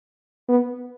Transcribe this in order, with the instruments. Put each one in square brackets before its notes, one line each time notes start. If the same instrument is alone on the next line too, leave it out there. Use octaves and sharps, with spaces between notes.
[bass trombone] B3